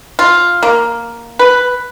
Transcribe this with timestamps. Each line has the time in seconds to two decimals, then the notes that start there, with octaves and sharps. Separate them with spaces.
0.19 F4
0.63 A#3
1.39 B4